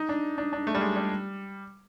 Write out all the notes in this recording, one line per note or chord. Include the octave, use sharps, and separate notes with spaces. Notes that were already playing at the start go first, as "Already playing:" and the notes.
Already playing: D#4
D4
D4
D4
A3
G3
G#3
G3